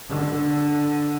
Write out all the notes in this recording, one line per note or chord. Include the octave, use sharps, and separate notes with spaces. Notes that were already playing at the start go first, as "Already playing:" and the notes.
D3